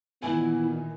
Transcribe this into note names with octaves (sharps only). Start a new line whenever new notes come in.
A#2 D#3 E3 B3 E4 G#5